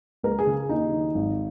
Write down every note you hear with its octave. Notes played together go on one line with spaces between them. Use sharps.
C#2 A#4
G#4
C#3
D#2 D#4
D#3
G#1